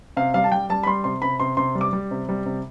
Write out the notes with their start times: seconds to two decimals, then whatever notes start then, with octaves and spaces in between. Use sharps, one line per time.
0.17 C3 F5
0.34 G3 F5
0.44 A5
0.52 G3 G5
0.70 G3 A5
0.83 B5
0.86 G3 C6
1.04 C3 C6
1.22 C3 B5
1.40 C3 C6
1.57 C3 C6
1.75 G3
1.81 D6
1.93 G3
2.11 C3
2.29 G3
2.46 C3